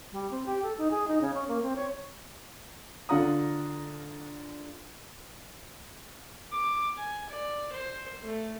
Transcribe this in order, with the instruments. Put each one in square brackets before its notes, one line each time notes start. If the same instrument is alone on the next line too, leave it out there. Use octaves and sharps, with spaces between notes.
[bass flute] G3
C4
G4
A4
D#4
G#4
D#4
C#3
C#4
A#3
C4
C#5
[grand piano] D3 D4 F4 F#5 A#5 D#6
[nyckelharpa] D6
G#5
D5
C5
A3